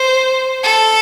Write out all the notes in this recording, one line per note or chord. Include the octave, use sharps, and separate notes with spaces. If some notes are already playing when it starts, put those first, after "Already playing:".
Already playing: C5
A4